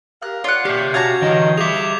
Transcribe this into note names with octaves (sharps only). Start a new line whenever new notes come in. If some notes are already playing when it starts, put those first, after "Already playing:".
G4 A#4 F5 F#6
F4 C#5 D5 F#5
A#3 G4 E5 G6 C7
C#4 F#4 F5 A5 A#5 G#6
D3 E3 D#5
G3 G#4 E5 D6 F7